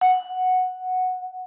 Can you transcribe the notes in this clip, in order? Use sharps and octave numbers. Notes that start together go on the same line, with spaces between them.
F#5